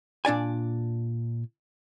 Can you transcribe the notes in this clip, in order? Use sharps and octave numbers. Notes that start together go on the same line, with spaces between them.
A#2 D4 D5 G#5